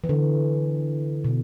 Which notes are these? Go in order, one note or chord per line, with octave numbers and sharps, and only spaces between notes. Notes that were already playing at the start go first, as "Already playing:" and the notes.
E3
D3
B2